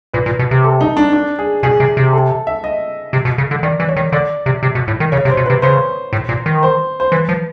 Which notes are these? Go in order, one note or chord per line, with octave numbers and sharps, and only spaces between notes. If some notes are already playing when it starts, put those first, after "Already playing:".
A#2 B4
A#2
B2
C3
A4
D#4
D4
D4
G#4
B2 G#4
C3
C3
A4
E5
D#5
C3
B2
C#3
D3
D#3 D5
E3
C#5
D#3
D3 D5
C3
C3
B2
A2
D#3
C#3 C#5
C3
C5
B2
C3 B4
C#3 C5
A2
A#2
D#3
C5
C5
E3 B4
F3